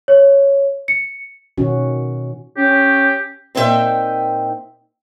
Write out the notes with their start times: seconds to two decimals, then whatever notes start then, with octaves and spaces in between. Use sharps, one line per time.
0.08 C#5
0.88 C#7
1.58 B2 D#3 C#4 F#4
2.57 C#4 G4
3.55 A#2 C4 D#4 F#4 E5 G5